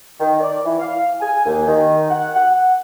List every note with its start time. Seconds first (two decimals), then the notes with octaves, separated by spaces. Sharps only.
0.20 D#3
0.41 D5
0.65 E3
0.80 F5
1.21 G#5
1.46 D#2
1.67 D#3
2.10 F#5
2.34 F#5